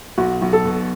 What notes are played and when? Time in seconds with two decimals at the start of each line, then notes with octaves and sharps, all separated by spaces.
0.18 B1 F#4
0.42 B1
0.53 A4
0.65 B2